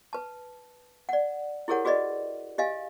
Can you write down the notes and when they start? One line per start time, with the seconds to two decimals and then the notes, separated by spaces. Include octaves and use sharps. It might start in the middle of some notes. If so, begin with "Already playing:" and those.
0.13 B4 A5
1.09 D5 F#5
1.68 E4 G4 G#4 A#4 C#5 F#5
1.85 F#4 G#4 B4 D5 D#5
2.58 G4 D#5 F5 G#5